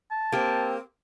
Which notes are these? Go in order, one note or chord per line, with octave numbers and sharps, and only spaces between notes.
A5
A#3 C4 G4